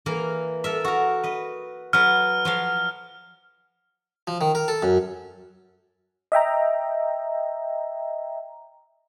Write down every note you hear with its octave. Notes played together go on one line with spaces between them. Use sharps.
E3 A#3 A#4
A4 A#4 E5
F#4 A#4
B4 D#5
F#3 B4 F6
F3 F#3 F5
F3
D#3
A#4
A4
F#2
D#5 E5 G5 A#5